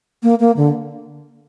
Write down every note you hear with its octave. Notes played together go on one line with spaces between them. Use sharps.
A#3
A#3
D3